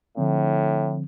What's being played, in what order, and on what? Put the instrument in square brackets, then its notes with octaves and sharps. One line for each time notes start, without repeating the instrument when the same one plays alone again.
[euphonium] A2 [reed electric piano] D3 F3 C4